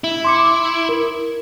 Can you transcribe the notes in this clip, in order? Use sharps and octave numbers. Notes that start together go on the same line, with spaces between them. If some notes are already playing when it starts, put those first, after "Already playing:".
E4
C6 D6 C#7
A#4